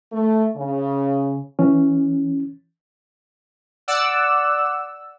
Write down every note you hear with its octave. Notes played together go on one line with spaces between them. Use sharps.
A3
C#3
E3 C#4
D5 F#5 E6